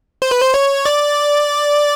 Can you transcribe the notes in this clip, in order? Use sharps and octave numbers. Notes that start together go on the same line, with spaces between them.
C5
B4
C5
C#5
D5